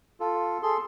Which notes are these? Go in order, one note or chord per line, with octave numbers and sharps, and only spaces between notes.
F4 A4
G#4 A4 C6